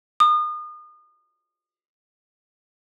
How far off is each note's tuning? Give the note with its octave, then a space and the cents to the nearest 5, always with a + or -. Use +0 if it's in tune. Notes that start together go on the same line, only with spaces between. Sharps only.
D#6 -35